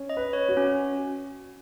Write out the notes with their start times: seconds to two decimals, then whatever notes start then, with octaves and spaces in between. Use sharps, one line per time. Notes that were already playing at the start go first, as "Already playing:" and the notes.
Already playing: C#4
0.09 D#5
0.17 B4
0.33 C#5
0.49 F#4
0.57 C#4